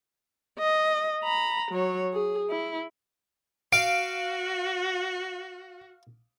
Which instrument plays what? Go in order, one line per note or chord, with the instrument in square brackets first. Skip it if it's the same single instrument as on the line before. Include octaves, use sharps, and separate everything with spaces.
[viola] D#5
A#5 B5
F#3 C#5
G#4
E4
[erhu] F#4 [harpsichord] F5 [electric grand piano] D7